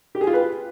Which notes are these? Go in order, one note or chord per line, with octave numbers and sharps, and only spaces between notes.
G4
G#4
F4
B4